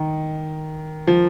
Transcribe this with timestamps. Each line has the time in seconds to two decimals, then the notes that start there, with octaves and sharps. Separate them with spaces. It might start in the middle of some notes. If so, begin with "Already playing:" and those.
Already playing: D#3
1.07 F3